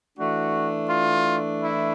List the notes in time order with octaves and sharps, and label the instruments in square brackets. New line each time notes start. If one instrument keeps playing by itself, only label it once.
[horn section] E3 A3 D4 F#4
F4
E4